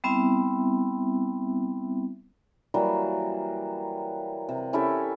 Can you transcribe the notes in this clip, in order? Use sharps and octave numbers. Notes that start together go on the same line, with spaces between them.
G3 B3 C4 E4 E5
E3 F#3 G3 A#3
C3
C#4 E4 G4 A4